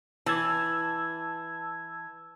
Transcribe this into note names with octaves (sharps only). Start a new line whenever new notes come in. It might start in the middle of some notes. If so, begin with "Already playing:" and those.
E3 A5 E6 G#6